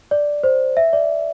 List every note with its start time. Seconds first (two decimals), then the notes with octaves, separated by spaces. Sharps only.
0.11 D5
0.44 C5
0.77 E5
0.93 D5